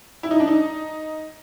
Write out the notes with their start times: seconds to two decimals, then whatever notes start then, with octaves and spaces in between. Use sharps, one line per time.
0.23 E4
0.31 D#4
0.40 D4
0.48 D#4